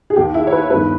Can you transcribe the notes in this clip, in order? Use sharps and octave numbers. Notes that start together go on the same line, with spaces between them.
G#4
D#2 D#3 G4
E4
C#5
B4
G1 G2 D#3 B4